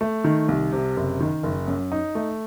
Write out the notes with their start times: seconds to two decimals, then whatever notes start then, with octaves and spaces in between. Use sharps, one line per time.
0.01 A3
0.24 D#3
0.48 C2
0.72 C3
0.97 F#1
1.20 D#3
1.43 F#1
1.68 F#2
1.92 D#4
2.15 A3